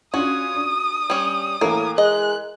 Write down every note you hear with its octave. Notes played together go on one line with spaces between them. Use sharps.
C#4 D4 F4 F#4 D#6
D4
G3 C#4
A2 E3 A#3 A#4
G#3 D#5 F#6